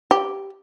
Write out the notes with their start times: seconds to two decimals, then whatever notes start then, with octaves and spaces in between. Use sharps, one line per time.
0.11 G4